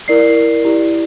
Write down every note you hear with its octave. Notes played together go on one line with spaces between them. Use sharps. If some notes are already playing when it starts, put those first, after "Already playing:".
E4 A#4 D5 C7
E4 G4 D5